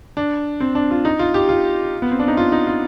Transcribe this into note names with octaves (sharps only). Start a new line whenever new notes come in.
D4
C4
D4
F4
D#4
F4
G4
F4
B3
C4
D4
D#4
F4
D#4
F4